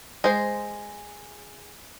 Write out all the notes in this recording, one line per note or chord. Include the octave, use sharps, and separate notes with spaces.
G#3 C5